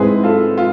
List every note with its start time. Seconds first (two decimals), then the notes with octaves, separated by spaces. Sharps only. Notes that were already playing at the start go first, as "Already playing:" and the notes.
Already playing: G#2 G#3 C4 E4 G#4 B4
0.23 F4 A4
0.57 F4